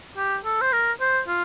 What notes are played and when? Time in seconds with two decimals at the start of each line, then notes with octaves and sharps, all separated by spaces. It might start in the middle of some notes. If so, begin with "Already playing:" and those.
0.17 G4
0.45 A4
0.61 C5
0.72 A#4
1.01 C5
1.28 F4